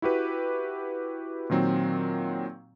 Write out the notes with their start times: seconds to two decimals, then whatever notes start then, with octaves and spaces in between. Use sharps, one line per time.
0.02 E4 F#4 G4 B4
1.50 A#2 D#3 F#3 C4